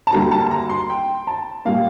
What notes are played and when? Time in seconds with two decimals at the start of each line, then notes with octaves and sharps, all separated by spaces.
0.07 A5
0.12 D2 D3 G3 A#3 A#5
0.31 A5
0.51 A#5
0.70 C6
0.90 G5
1.27 A5
1.65 A#2 G3 A#3 F5